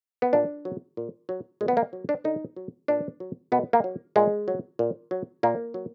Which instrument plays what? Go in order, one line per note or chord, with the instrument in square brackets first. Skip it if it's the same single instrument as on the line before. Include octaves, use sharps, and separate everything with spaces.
[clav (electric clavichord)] B3
A#2 D4
F#3
A#2
F#3
A#2 G#3
B3
A#3
F#3
D4
D3 D#4
F#3
A#2 D4
F#3
B2 B3
A#3
F#3
A#2 G#3
F#3
A#2
F#3
A#2 A#3
F#3